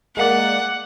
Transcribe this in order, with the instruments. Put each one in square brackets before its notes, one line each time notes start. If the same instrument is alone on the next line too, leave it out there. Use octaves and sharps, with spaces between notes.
[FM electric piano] G#3 A#3 D5 [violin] F#5